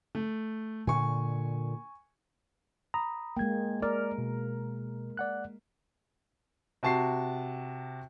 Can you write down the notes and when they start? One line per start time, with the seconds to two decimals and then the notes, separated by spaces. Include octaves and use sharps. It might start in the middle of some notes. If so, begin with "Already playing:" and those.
0.15 A3
0.87 A#2 D3 G#5 C#6
2.94 A#5 B5 D#6
3.37 G#3 A#3 G5 G#6
3.82 A#4 D5 F6
4.18 B2
5.17 D5 F#5 F#6
6.83 C3 F#4 A5 C#6 C7